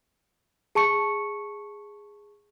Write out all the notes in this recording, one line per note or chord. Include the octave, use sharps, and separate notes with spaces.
G#4 A5 C#6 C#7